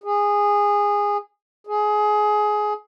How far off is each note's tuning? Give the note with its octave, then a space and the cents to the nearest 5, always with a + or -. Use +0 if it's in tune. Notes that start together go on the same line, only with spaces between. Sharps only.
G#4 -15
G#4 +20